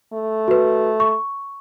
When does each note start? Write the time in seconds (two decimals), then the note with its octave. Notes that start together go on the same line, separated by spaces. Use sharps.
0.13 A3
0.48 F#4 B4
1.00 C#6